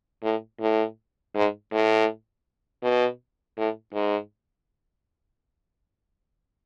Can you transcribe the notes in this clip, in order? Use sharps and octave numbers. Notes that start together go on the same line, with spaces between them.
A2
A2
G#2
A2
B2
A2
G#2